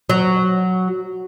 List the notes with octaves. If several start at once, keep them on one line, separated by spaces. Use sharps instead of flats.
F#3